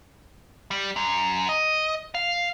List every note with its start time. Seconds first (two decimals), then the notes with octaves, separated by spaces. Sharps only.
0.71 G3
0.96 F#2
1.49 D#5
2.15 F5